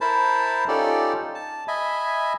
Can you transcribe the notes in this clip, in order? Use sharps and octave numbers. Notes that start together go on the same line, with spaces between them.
E4 A#4 C5 A5 B5
C#4 D#4 F4 G4 A4 D5
A5
D#5 E5 G#5 B5